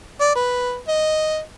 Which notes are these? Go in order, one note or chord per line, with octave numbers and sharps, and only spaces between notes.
D5
B4
D#5